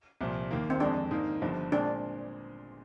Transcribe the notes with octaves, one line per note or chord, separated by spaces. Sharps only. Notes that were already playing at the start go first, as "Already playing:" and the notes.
C2 A#2 F3
D#2 D#3 A#3
C4
F2 D3 G#3 D4
G#2 D#3 A#3
G1 G2 D3 F3
A#2 G#3 C4 D4